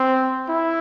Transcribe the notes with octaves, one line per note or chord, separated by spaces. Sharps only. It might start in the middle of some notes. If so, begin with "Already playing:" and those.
Already playing: C4
E4